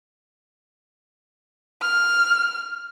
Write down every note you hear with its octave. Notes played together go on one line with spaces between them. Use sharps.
F6